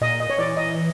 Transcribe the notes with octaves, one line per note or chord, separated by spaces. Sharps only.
A#2 D#5
D#5
C#5
E3 D5
D#5